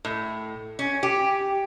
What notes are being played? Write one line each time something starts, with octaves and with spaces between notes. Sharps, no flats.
A2
C#4
G4